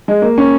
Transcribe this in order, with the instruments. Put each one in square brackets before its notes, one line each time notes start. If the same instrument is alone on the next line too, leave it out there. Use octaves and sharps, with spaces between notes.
[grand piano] G#3
A#3
C#4